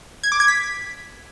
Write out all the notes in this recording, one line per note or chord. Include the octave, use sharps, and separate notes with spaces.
G#6
D6
G#6
B6